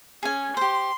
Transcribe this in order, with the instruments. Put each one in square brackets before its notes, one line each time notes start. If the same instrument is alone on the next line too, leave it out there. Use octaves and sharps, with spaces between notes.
[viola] C#4 [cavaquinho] G#4 G#5
[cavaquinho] G4 C5 [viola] C6